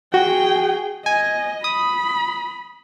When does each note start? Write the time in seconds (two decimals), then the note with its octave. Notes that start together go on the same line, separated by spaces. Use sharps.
0.14 F#4 G#4 G5
1.06 D#5 G#5
1.64 B5 D#6